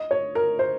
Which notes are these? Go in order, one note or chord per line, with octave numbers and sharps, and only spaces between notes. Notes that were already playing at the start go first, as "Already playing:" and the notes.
Already playing: D#5
C#5
A#4
C5